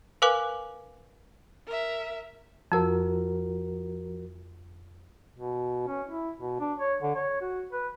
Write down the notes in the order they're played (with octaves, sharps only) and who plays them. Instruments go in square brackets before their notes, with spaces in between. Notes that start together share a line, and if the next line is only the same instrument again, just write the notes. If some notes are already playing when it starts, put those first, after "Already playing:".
[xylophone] A#4 B4 F5 G#5 D6 F#6
[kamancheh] A#4 E5
[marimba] F2 E6 [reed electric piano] F3 F#4 A#4
[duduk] B2
C#4
E4
B2
D4
C#5
D3
C#5
F#4
B4